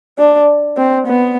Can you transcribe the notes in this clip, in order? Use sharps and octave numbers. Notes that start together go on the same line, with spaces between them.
D4
C4
B3